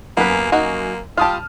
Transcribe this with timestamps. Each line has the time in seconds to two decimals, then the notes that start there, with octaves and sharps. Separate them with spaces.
0.17 F#2 A#3 B3 B4
0.52 A#3 D#4 F#4
1.18 G3 F4 G4 A5 D#6 F6